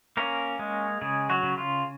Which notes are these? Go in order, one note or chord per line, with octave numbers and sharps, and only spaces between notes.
A#3 C#4 A#4
G#3
C#3 G#3 G#4
F#3 F#4
C#3
F4